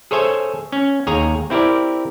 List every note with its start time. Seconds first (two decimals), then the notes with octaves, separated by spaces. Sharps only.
0.11 G#4 A4 C5 C#5 E5 G#5
0.72 C#4
1.07 D#2 G#4 C#5 G#5 A#5
1.50 C4 E4 G4 A#4 D5